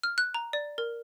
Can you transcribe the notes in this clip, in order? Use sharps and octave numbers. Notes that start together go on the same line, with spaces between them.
F6
F#6
A#5
D5
A#4